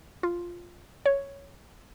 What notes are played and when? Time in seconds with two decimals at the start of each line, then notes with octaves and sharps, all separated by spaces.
0.23 F4
1.06 C#5